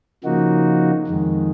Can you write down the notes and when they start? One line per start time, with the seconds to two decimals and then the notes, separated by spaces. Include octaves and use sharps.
0.24 C#3 F3 A#3 D#4 F#4
1.08 F2 D#3 G#3